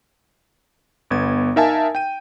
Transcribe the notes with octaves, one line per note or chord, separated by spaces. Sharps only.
G1 B3 G#6
D#4 A#4 E5 F5 G#5 A5
G5 D#7